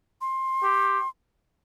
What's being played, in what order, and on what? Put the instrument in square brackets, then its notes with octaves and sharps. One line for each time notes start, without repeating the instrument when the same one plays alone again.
[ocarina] C6
[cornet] G4